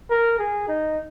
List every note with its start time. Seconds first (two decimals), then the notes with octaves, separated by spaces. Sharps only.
0.10 A#4
0.39 G#4
0.68 D#4